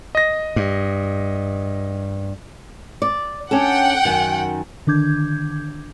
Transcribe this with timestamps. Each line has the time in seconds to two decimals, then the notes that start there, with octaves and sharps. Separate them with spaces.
0.15 D#5 A#6
0.56 G2
3.02 D5
3.51 C#4 D4 A4 F#5 G5
4.05 F#2 D#3
4.87 D3 D#3 D4 D6 G6 G#6